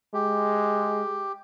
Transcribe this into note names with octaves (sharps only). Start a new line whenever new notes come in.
G#3 G4